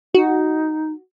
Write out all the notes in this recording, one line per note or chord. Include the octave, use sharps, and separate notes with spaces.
D#4 F#4